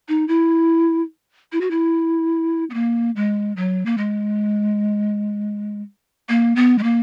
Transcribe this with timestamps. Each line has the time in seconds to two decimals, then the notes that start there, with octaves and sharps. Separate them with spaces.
0.09 D#4
0.28 E4
1.52 E4
1.61 F#4
1.71 E4
2.70 B3
2.74 A#3
3.16 G#3
3.57 F#3
3.86 A#3
3.98 G#3
6.29 A#3
6.56 B3
6.78 G#3
6.83 A#3